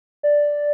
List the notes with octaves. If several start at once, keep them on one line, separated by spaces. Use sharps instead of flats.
D5